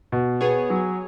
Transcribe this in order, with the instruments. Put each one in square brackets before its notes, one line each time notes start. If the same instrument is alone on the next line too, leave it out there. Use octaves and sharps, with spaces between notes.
[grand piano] B2
[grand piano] B3 [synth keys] G#4 C#5
[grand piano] F#3